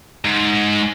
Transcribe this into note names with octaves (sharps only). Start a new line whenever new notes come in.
G#2